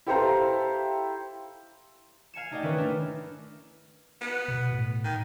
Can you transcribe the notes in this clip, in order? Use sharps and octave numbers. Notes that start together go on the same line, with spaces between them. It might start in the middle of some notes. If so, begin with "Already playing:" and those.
E4 G4 A4 C5 F5 A#5
F5 G#5 C#7 E7
A3 D#4 G#4 D5 D#5 G5
D#3 C#4 E4 A#4 B4
A3 D4 D#4 F6 E7
B3
B2
A2
D#3